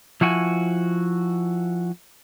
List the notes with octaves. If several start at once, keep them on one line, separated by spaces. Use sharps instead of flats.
F3 E4 F#4 G5 G#5